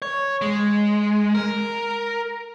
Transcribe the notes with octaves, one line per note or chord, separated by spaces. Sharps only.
C#5
G#3
A#4